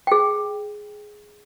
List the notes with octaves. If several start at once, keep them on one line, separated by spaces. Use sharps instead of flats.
G#4 G5